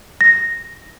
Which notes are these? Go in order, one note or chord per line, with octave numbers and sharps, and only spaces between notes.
A#6